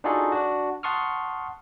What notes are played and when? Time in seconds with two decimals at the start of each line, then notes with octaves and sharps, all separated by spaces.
0.04 D4 D#4 F4 F#4 G#4 A4
0.32 D4 F#4
0.83 F#5 A5 C6 C#6 D#6 F6